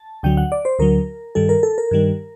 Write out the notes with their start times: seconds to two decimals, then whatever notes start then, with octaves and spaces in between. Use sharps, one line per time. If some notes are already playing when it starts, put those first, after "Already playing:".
Already playing: A5
0.23 D2 D3 F#3 G5
0.37 F#5
0.52 D5
0.65 C5
0.79 D2 D3 F#3 A#4
1.35 G2 D#3 G3 A4
1.49 A#4
1.63 A4
1.78 A#4
1.91 G2 D#3 G3